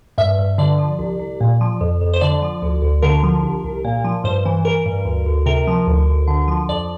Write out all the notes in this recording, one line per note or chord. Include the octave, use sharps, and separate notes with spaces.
G2 E5
G2
D3 D5
F3
C2
C2
A#2
F3
F2
F2
C5
D3 D5
F3
D2
D2
D3 A#4
F3
C2
C2
A#2
F3
G2 C5
E3
E3 A#4
G2
D2
D2
C3 A#4
F3
D2
D2
D3
F3
F2 D5